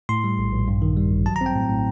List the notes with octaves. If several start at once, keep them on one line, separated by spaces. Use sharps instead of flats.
A2 C6
G3
A#1
A#1
G2
D#3
G3
A1
F#3 A5
A#5
C4
G5
A2
A2